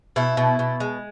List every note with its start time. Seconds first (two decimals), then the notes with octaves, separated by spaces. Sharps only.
0.16 B2 E4
0.37 B2
0.59 B2
0.80 G#3